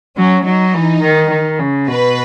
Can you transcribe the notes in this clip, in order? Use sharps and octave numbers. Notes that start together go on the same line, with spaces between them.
F#3 C#4
F#3 D#4
E3
D#3
D#3
C#3
B2 B4